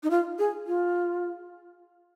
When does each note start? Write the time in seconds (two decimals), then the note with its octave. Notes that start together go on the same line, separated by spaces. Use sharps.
0.03 D#4
0.10 F4
0.39 G#4
0.67 F4